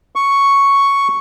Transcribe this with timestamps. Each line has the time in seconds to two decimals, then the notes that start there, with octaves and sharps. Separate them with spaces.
0.16 C#6